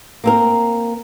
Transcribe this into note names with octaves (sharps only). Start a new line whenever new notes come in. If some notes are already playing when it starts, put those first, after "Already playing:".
A#3 C4 A#4